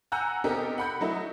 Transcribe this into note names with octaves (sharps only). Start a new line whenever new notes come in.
F#5 G#5 A#5 E6 F#6 G6
B3 C4 D#4 G4 A4 A#4
F#5 B5 G6
F#3 A3 D#4 E4